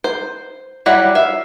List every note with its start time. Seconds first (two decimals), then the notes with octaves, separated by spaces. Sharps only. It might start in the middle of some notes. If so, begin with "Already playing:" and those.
0.04 C5
0.86 F#3 G3 E4 D5 F#5
1.15 E5 F5